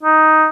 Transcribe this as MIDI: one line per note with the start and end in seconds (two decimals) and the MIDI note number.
0.03 0.47 63